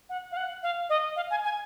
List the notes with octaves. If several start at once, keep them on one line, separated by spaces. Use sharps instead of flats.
F#5
F5
F#5
F5
D#5
F5
G#5
G#5